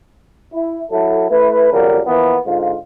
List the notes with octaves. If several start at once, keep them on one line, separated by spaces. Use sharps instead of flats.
E4
F#3 E4 A4
A3 E4 B4
F2 C#3 F#3 G3 A#4
E3 F3 A#3 B3
G#2 D3 F4